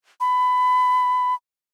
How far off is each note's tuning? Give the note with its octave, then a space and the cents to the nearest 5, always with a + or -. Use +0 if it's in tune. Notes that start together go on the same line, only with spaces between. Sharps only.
B5 +20